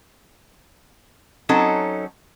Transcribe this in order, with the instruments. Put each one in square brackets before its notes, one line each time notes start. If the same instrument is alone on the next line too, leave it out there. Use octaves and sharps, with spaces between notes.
[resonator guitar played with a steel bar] F#3 C4 C#4 D#4 A4